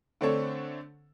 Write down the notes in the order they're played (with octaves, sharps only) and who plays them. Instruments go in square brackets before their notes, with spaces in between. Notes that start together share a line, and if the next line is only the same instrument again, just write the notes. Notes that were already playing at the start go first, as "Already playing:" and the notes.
[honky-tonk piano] D3 A3 C4 D4 A4 C#5